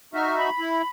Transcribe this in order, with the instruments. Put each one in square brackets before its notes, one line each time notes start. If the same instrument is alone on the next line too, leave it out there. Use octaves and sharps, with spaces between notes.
[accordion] D#4 F#4 E5 [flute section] F6
[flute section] B5
[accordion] E4